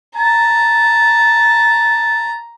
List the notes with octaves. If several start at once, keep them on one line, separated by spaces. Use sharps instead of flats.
A5 A#5